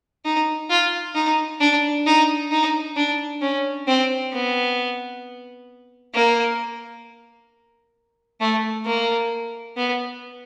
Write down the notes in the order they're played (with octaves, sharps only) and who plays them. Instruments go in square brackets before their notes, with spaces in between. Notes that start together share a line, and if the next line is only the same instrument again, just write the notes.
[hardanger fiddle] D#4
F4
D#4
D4
D#4
D#4
D4
C#4
C4
B3
A#3
A3
A#3
B3